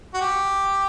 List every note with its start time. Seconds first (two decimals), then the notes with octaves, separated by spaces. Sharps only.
0.14 F#4
0.21 G4